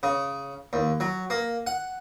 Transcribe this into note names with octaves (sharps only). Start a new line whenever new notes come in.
C#3
D#2
F#3
A#3
F#5